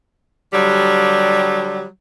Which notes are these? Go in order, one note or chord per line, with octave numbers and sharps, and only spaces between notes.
D3 F#3 G3